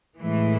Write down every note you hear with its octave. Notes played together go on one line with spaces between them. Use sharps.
A2 E3 G#3